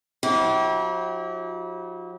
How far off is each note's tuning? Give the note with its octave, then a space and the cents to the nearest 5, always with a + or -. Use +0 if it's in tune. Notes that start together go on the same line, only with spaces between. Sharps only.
F3 +45 E4 -40 G4 -35